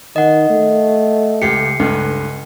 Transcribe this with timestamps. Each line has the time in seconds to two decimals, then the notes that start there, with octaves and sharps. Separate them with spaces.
0.16 D#3 D#5 F#5
0.50 A3
1.42 C#2 G4 C7 C#7
1.79 C#2 G2 A3